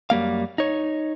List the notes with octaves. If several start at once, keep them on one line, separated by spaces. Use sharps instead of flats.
F#2 G3 A#3 F5
D#4 C#5